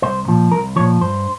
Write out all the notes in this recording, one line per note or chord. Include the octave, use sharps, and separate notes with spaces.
C2 C5
A#2 F3
C2 A#4
A#2 F3 C#5
G2 C5